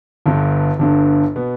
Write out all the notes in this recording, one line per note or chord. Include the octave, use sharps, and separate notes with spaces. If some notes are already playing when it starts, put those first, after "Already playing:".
G1 G2 D3
G1 G2 D3
B2 B3